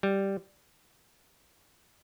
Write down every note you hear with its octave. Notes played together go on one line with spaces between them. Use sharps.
G3